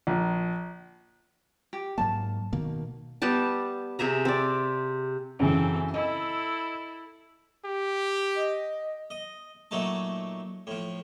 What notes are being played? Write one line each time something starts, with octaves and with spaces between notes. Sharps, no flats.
A#1
G4
G#2 F#3 A#3 A5
B2 D#3 A#3
G3 B3 G4 A5
C3 G#4 E5 A#5
C4 D5
F#2 C#3 E3 C4 A4
E4 A4 D#5
G4
D#5
D#5
A#2 F#3 A3 D#4 A5
A2 F3